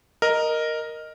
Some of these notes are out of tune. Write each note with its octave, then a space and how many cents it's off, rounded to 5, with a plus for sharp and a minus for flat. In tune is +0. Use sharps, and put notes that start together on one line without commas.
A#4 +0 D#5 -5